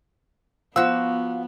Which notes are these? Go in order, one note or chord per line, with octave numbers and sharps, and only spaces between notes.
F3 B3 F#4 F5 E6